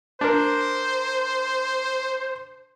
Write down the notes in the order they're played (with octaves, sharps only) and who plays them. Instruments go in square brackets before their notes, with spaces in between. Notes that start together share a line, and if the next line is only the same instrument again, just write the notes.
[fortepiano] D4 A#4 [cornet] C5